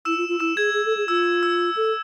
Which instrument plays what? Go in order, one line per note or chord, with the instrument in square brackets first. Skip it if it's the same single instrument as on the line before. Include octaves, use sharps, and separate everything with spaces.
[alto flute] E4 [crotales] E6 E7
[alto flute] F4
F4
[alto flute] E4 [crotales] E6 E7
[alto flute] G#4 [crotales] G#6
[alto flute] G#4
A4
G#4
[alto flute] F4 [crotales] E6
[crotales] E6
[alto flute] A4